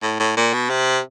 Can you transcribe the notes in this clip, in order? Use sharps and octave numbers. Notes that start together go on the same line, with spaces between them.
A2
A2
A#2
B2
C3